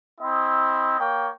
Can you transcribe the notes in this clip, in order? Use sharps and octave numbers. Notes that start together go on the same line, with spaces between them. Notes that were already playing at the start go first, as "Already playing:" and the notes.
C4 E4 D#5
A#3 C#5 G5